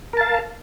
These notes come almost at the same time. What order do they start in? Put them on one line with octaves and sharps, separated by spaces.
A#4 A5 F5